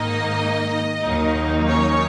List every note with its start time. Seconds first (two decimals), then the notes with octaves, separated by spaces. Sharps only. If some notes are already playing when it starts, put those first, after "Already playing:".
Already playing: G#2 D#3 A#3 D#4 D#5
1.02 D#2 D#3 F#3 A#3 D#4
1.67 C#4 C#5